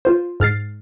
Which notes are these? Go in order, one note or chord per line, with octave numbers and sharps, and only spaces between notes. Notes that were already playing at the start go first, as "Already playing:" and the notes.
F4 C5
G#2 F6 A6 C7